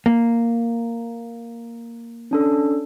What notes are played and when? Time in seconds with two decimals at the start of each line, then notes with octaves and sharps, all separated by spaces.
0.06 A#3
2.31 C#4 D4 A4